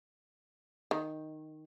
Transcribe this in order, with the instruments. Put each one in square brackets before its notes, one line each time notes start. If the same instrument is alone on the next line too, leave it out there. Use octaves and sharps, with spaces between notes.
[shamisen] D#3